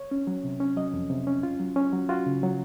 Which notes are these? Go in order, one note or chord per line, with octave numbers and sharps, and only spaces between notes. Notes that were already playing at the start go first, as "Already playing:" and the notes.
Already playing: C#5
C#4
F#3
C3
C#4
F#3 D#5
F2
C3
C#4
F4
F#3
C#4
F#3
F4 F#4
C#3
F#3